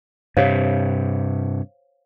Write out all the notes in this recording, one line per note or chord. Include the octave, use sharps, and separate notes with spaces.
G2 C3 C5 C#5 F5